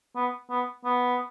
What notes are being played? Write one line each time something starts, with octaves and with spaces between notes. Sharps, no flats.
B3
B3
B3